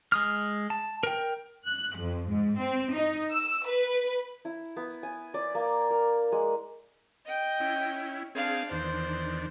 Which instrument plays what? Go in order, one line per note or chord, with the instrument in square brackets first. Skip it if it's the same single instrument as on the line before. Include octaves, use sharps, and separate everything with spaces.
[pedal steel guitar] G#3 D#6 F6
A5
A#4 G5
[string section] F#6
F2
G#2
C4
D#4
E6
B4
[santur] E4
B3
G#5
D5
A#3
A#4
G#3
[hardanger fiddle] D#5 G5
[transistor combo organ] C#4 E4
[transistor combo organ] C4 G#4 [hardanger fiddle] D4 F5
[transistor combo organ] E2 D#3 D4 [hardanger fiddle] C5